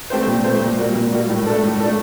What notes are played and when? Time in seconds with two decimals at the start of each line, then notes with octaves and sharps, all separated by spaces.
0.10 A3 C4 G4 C5
0.27 A#2
0.44 A3 C4 G4 C5
0.61 A#2
0.78 G3 A#3 F#4
0.96 A#2
1.12 G3 A#3 F#4
1.30 A2
1.46 A3 D4 A4
1.63 A2
1.80 A3 D4 A4